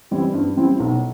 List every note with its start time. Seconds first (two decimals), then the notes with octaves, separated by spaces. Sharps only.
0.11 E3 G3 C4 E4
0.34 G2
0.56 E3 G3 C4 E4
0.80 B1